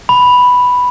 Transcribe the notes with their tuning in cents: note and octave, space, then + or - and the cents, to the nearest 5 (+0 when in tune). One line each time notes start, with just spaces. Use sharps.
B5 +0